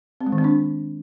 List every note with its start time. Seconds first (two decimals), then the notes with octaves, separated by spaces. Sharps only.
0.21 C4
0.26 G#3
0.32 D#3
0.38 C4
0.44 D4